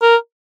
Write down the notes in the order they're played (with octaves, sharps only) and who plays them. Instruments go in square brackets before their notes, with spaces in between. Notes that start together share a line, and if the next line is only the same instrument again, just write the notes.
[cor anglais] A#4